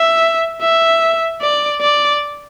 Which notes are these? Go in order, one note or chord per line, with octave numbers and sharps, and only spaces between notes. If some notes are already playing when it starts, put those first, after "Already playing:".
Already playing: E5
E5
D5
D5